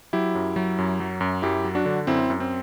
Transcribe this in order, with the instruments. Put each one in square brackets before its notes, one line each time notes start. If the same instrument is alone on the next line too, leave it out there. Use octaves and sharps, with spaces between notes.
[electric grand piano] F#3 E4 G4
F#2
F#3
F#2
F#3
F#2
F#2 E4 G4
F#3
D4 F#4
D3
F#2 C4 E4
F#2
C4